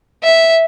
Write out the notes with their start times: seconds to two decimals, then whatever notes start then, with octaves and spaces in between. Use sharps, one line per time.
0.24 E5